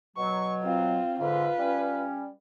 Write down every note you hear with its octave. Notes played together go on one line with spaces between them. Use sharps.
B2 F#3 C#6
C4 F4
G#2 D3 F4 B4
G3 C#4